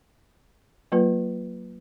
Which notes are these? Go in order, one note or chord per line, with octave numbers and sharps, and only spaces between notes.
F#3 A#3 F4 B4